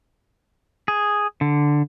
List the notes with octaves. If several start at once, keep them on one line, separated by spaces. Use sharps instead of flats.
G#4
D3